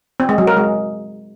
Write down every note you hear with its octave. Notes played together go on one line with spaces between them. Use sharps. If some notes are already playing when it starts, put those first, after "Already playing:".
C4
G#3
F#3
A#4
G#3